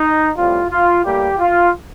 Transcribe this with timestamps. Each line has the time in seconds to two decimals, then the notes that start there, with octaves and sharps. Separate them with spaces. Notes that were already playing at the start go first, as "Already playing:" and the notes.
Already playing: D#4
0.37 A2 G3 C4 F4
0.70 F4
1.04 A2 G3 A#3 G4
1.39 F4